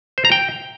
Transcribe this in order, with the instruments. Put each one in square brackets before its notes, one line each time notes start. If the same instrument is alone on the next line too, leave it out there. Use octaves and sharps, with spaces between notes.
[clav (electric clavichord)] C5
A#5
G5